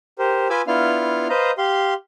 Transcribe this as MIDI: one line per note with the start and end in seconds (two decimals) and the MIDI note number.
0.19 0.48 67
0.19 0.48 70
0.19 0.48 72
0.50 0.62 65
0.50 0.62 71
0.50 0.62 80
0.50 0.62 83
0.50 0.62 86
0.50 0.62 88
0.67 1.28 59
0.67 1.28 62
0.67 1.28 64
0.67 1.28 65
0.67 1.28 77
0.67 1.28 89
1.29 1.51 71
1.29 1.51 72
1.29 1.51 75
1.29 1.51 77
1.29 1.51 82
1.58 1.94 67
1.58 1.94 77
1.58 1.94 84